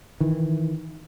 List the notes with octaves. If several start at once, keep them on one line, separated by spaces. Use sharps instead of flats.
D#3 E3